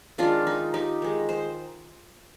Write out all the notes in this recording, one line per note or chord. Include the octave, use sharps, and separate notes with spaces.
D#3 G#3 D4 F4
D#4
D#4 G4
D#3 G#3
C5